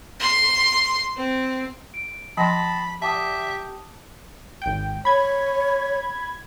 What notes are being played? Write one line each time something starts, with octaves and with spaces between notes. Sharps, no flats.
C6
C4
D7
F3 G5 A5 B5 C6 D#6 A#6
G4 E5 A5 D6 D#6
G#1 G5
C#5 B5 G#6